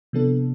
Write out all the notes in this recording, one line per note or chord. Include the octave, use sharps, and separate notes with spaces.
C3 F3 B3 D4 A4